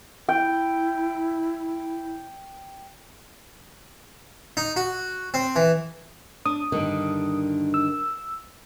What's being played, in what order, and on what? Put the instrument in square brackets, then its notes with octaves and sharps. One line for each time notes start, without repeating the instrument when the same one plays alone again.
[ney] E4 [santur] G5
[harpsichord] D#4
F#4
C4
E3
[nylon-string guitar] D4 [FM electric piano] D#6
[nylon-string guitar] G2 D3 D#3
[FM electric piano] E6